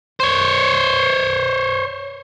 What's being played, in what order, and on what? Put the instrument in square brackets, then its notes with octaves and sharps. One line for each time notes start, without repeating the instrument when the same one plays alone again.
[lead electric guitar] C5 C#5